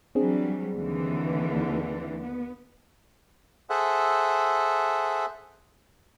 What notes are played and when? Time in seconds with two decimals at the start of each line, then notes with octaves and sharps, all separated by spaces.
0.15 E3 F#3 G3 C4 D4 G#4
0.74 D#2 D3 E3
2.23 B3
3.70 G#4 A4 C5 E5 F#5